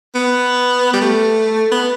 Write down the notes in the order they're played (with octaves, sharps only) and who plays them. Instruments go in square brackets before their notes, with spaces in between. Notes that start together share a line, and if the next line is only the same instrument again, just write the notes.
[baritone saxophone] B3
G3
A3
B3